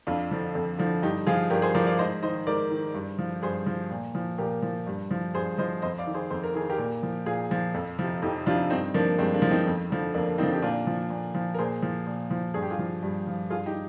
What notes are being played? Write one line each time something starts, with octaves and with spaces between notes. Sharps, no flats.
F2 D4 F4
D3 F3
F2
D3 F3
G2 D#4 G4
F3 F4 G#4
G2 G4 A#4
G#4 C5
F3 A#4 D5
D5 F5
G#2 C5 D#5
D#3 C5 D#5
G#2 A#4 D5
D#3
G2
F3
G2 G#4 C5
F3
A#2
F3
A#2 G4 A#4
F3
G2
F3
G2 G#4 C5
F3 C5 D#5
F2 C5 D#5
D5 F5
D#3
G#4 C5
F2 C5
A#4
D#3 G#4
G4 A#4
A#2
F3
A#2 F4 G#4
F3
F2
C3 F3
F2 D#4 G4
C3 F3 D4 F4
G2 C4 D#4
F3 A#3 D4
G2 G#3 C4
A#3 D4
F3
C4 D#4
F2
D3 F3
F2 A#3 D4
D3 F3 C4 D#4
G4
A#2 D4 F4
F3
A#2
F3
A#4
A#2 G#4 C5
F3
A#2
F3
G2 G#4
G4
F4 G#4
F3
G2
F3
G2 F4 G#4
D#4 G4